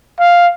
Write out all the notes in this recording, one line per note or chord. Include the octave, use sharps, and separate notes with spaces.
F5